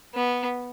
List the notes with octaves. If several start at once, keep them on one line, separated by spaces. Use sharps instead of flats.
B3